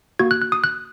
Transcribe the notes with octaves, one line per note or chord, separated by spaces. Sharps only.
A#3 F#4 G#6
F#6
F#6
D#6
F#6